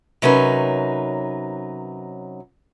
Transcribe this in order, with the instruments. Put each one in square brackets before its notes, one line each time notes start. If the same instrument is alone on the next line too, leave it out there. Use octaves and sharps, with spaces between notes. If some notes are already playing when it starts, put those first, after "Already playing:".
[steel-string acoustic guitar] C3 F#3 C#4 D#4 A#4 B4